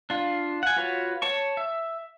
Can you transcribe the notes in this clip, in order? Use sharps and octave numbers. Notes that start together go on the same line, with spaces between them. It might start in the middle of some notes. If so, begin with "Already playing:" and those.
D4 F4
F#5 G#5
F4 F#4 B4 C#5
C#5 A5 C#6
E5